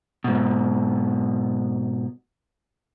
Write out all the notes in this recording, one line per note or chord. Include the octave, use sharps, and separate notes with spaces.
G#2 B2